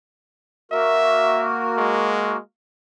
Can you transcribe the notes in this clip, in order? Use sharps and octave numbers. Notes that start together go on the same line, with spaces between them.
A#3 F#4 A#4 E5
G#3